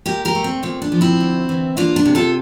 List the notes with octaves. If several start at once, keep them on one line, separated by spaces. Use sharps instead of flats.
A#2 G4 A#4
G4 A#4
A3
C4
A#2 C4
D4
F3
C4 E4
D2
E3
A#3 D4 F4
D4
C3
F4 A4